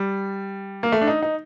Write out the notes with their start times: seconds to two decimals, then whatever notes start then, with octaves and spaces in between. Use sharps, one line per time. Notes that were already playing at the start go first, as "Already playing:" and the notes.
Already playing: G3
0.83 A#3
0.92 A3
1.01 D4
1.08 D#4
1.22 D#4